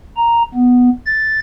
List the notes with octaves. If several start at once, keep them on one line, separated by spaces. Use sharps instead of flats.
A#5
B3
A6